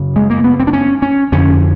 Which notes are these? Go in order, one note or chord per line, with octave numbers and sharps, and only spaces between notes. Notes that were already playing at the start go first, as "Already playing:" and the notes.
Already playing: F#2 C#3
G#3
A#3
B3
C4
D4
C#4
C#4
F2 D3 C#4